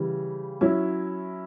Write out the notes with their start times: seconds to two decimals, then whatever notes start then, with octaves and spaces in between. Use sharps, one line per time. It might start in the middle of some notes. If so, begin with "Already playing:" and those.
Already playing: C#3 E3 G3
0.61 F#3 C#4 E4